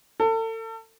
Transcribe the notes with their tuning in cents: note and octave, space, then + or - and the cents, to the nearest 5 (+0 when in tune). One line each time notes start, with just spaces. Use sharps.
A4 +35